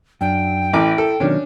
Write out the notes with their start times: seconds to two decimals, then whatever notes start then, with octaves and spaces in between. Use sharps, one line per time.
0.21 F#2 D4 G5
0.73 A1 E3 E4 D6
0.98 A4
1.20 B2 D#3 F#3 C#4 D4